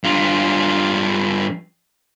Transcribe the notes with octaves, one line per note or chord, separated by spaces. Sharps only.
G2 F4